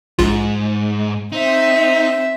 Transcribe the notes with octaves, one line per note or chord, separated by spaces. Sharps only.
A#1 G#2 F4
C4 D#4 C5 E5